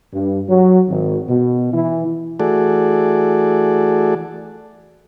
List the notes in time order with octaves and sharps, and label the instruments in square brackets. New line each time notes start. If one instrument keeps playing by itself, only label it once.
[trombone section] G2
F#3
G#1
B2
E3
[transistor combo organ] E3 A3 F#4 G#4 A4 D5